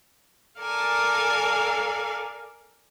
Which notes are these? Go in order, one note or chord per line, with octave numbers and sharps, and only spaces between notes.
A4 A#4 D5 F5 G#5 A5